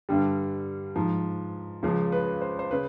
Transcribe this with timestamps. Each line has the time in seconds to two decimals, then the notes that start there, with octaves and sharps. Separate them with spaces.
0.09 G2 D3 G3
0.96 G#2 F3
1.83 C#2 C#3 F3
2.12 B4
2.41 C5
2.59 C5
2.71 C#3 B4